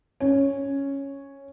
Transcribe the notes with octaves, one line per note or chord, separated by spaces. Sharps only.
C#4